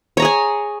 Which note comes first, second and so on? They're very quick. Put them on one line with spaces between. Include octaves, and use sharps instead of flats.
C#5 A#5 G#4 G#5